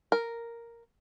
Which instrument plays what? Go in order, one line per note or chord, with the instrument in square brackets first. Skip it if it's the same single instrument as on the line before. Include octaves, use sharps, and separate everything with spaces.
[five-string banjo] A#4